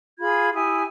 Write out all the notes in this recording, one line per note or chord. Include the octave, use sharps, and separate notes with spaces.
F4 G#4 B5 G#6
E4 G4 G#5 D#6